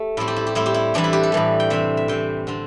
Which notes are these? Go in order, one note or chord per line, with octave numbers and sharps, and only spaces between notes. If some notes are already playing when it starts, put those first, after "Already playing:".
Already playing: A3 G4
A2 G3 C4 E4
G4
E4
G4
A2 G3 C4 E4
G4
E4
A2 E3 G3 D4
E4
G4
A4
A2 E3 G3
G5
C3 E3 C4 E5
E5
C3 E3 C4 G5
D3 C4